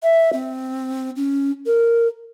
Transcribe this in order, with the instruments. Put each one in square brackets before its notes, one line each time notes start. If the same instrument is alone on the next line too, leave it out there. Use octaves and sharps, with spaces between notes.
[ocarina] E5
C4
C#4
A#4